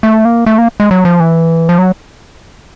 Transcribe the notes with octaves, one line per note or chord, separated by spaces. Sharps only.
A3
A#3
A3
A#3
G#3
F#3
F3
E3
F3
F#3